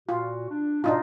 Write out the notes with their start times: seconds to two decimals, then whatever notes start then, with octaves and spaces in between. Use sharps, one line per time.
0.09 A#2 F4 F#4
0.49 D4
0.84 G#2 B2 D4 D#4 F4